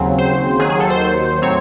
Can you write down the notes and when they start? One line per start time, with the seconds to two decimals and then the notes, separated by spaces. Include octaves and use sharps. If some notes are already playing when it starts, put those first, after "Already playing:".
Already playing: D#2 C#3 F#3 C4
0.18 C5
0.59 D#2 D#3 F#3 G#4
0.70 G#4
0.80 A4
0.90 C5
1.42 A2 F#3 C4 C#5